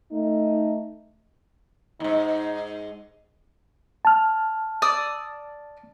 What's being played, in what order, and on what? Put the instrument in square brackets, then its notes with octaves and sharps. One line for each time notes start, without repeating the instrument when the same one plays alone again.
[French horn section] A3 D#4
[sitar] E2 G#2 [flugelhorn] D#4
[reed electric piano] A5 F6
[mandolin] D5 D#6 E6